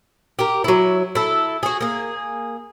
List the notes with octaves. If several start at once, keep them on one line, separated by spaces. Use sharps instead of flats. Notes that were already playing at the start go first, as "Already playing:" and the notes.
G4 A#4
F#3 E4
E4 A4
F#4 G#4
A#3 G#4